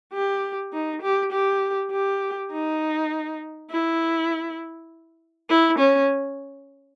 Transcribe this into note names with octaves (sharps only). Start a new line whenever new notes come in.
G4
D#4
G4
G4
G4
D#4
E4
E4
C#4